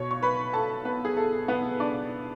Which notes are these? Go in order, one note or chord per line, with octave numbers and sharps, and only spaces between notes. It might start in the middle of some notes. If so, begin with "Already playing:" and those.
Already playing: B2 C#5 C#6
C#6
B4 B5
A4 A5
B3 B4
G#4
A4
B3 B4
D4 D5